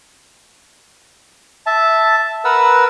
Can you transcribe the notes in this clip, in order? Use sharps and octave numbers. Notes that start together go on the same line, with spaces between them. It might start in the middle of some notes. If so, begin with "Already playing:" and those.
E5 A5
A#4 B4 F#5 E6